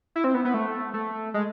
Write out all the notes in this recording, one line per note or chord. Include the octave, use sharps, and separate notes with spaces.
E4
C4
B3
B3
A3
A3
G#3